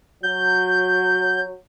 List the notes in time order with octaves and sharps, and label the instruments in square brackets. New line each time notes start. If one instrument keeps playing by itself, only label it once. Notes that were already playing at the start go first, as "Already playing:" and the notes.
[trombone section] F#3 [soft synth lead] G6